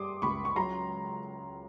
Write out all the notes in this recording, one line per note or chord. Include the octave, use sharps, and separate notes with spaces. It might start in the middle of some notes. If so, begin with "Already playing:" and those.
Already playing: G3 C6 D6 D#6
C#2 B5 C#6
C#6
F#3 A#5 C6